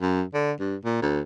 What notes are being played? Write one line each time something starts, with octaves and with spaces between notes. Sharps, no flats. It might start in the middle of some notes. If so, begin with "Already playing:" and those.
F#2
D3
G2
A#2
D2